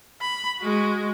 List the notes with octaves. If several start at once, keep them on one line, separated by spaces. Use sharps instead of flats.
B5
G#3 F#4